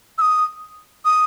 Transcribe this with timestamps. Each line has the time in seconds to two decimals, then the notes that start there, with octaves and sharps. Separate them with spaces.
0.18 E6
0.21 D#6
1.05 D#6